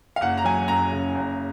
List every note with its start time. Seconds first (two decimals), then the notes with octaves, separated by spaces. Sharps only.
0.16 F5
0.21 F#1 F#5
0.38 A#5
0.45 F#3 G#5
0.68 F#2 A#5
0.92 C#3
1.15 F#1